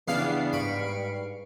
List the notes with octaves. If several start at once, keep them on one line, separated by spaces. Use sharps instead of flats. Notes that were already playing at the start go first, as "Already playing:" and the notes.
E2 G2 C#3 B3 D4 F5 C7
G#2 B5 C#6 D7